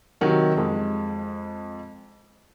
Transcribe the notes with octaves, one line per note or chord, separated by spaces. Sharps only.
C3 D#3 F#3 A#4
F2 G#3